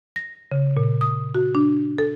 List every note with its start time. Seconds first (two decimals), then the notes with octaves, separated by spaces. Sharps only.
0.16 A#6
0.52 C#3
0.77 A#2
1.01 D#6
1.35 F#4
1.55 D4
1.98 A4